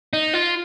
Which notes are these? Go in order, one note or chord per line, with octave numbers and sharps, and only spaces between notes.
D#4
F4